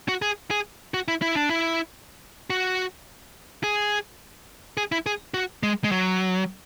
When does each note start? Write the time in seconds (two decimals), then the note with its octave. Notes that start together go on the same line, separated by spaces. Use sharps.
0.08 F#4
0.22 G#4
0.51 G#4
0.94 F#4
1.08 E4
1.22 E4
1.35 D4
1.49 E4
2.50 F#4
3.64 G#4
4.77 G#4
4.92 E4
5.06 G#4
5.34 F#4
5.63 G#3
5.84 G#3
5.91 F#3